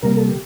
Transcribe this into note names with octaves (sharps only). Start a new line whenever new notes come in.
C3 G3 A#3 A#4
A4
G4